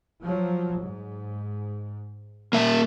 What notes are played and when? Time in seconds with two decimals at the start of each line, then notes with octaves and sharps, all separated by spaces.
0.22 F3 F#3
0.80 G#2
2.53 A#2 A#3 E5